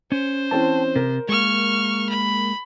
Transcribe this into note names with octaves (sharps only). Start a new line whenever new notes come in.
C#4 C5
E3 C4 C#4 G5 A5
C3 A#4
G#3 A#3 C#6 F6
B5